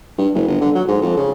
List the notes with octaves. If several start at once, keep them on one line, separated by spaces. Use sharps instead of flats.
G2
F#1
G1
D3
F#3
G#2
F2
C#3